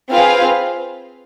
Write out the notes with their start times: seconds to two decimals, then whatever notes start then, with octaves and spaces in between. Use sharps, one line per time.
0.10 C4 F4 G#4 B4 F5